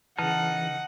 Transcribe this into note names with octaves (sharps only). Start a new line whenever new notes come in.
C#3 E3 D#4 F#5 A5 F6